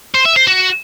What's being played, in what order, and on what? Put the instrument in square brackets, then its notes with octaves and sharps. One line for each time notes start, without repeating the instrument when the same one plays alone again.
[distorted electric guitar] C5
E5
C5
F#4